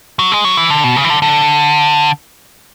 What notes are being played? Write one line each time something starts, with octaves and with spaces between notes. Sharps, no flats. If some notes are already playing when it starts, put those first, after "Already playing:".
F#3
G#3
F#3
E3
D3
B2
C#3
E3
D3
D3